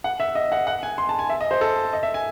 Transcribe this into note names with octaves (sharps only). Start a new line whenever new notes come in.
F#5
E5
D#5
F#5
F#5
G#5
C6
A5
G#5
E5
D#5
C5
A4
D#5
E5
G#5